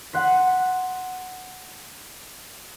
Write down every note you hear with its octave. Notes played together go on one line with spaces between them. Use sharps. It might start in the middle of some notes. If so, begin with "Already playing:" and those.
F#5 C6 B6